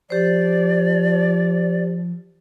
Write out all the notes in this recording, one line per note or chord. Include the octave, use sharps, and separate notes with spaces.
F3 G4 C5 D5